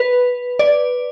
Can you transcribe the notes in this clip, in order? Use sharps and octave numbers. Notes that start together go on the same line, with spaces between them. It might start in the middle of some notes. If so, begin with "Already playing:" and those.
Already playing: B4
D5